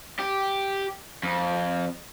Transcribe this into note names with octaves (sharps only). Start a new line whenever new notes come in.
G4
F2